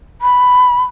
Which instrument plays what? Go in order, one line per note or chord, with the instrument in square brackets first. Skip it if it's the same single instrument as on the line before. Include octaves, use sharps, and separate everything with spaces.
[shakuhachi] B5